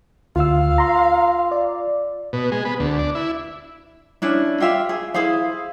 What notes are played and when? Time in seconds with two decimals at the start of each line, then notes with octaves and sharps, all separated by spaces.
0.36 D2 F4 F5 E6
0.78 A#5 C6
1.51 D5
2.33 B2
2.52 G#3
2.65 B3
2.80 D2
2.99 D4
3.15 E4
4.22 C#4 D4 E4
4.60 F4 G4 E5 F5
4.89 G#4
5.14 E4 G#4 C5 F5